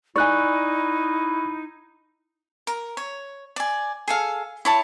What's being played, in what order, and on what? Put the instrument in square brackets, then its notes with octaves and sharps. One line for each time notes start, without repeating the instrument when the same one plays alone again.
[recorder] D#4 [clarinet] E4 [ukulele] D5 G#5 [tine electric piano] C#6 F#6
[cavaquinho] A#4
C#5
D5 G#5
G#4 A4 F5
E4 C#5 A5